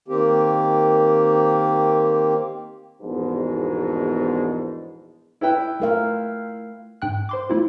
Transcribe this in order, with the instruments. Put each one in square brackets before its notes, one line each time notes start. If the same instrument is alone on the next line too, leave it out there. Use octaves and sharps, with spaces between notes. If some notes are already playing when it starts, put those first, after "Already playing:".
[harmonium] D#3 A#3 C4 G4
[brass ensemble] A#1 E2 G#2 B2
[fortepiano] E4 B4 G5
[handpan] A3 A#4 F5
[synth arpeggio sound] G#2 G5 F#6
C5 C6 D6
A3 E4 F4